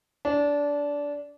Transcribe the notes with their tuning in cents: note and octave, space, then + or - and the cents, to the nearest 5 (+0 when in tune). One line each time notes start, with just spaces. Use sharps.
D4 -20